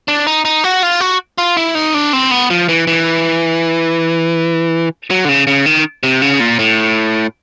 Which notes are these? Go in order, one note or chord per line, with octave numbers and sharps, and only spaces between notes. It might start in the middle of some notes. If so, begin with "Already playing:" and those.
D4
D#4
D#4
F#4
F4
F#4
F4
E4
D#4
D4
C4
B3
F3
E3
E3
F#3
D3
C#3
C#3
D#3
C3
C#3
A#2
A2